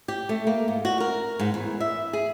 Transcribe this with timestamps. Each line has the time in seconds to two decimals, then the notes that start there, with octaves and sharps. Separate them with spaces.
0.08 G4
0.29 A3
0.47 A#3
0.68 G#2
0.85 F#4
1.00 A#4
1.39 G#2
1.54 E2
1.80 E5
2.13 G#4